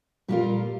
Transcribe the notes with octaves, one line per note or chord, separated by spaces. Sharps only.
A#2 G3 D4 F4 A#4